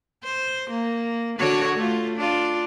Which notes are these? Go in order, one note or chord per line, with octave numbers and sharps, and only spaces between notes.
C5
A#3
D3 F#4 C#5
A3 F4
D4 F4